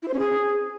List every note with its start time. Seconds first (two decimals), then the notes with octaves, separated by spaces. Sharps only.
0.02 E4
0.08 C5
0.13 C#4
0.19 G#4